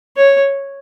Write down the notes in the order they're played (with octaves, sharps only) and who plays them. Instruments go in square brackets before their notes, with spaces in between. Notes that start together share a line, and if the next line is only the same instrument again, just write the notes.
[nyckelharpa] C#5